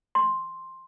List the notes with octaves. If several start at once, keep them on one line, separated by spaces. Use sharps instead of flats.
C6